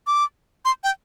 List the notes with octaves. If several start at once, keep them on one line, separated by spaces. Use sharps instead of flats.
D6
C6
G5